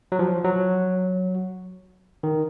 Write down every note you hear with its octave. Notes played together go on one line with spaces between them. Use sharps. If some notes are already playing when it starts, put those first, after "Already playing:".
F#3
F3
F#3
D#3